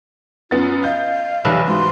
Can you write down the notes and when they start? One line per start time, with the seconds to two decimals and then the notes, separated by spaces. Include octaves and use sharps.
0.51 F#2 B3 F4 A6
0.84 D#5 F5 G6
1.45 F1 B1 E3 G4
1.68 G#2 F#4 C6